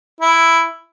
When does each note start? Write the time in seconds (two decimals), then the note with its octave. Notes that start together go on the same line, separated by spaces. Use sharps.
0.21 E4